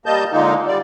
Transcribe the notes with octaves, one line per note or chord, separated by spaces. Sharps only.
G3 A#3 D#5 A5 G6
A#2 D3 G#3 A#3 D#4
G3 D5